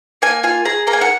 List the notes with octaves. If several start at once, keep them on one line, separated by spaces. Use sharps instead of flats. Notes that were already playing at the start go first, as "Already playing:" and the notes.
A#3 G#5
F4 G#5
G#4 A#5
A#3 A#5
G#5
F#5